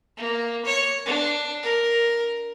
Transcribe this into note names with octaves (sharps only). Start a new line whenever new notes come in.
A#3
C#5
D4
A#4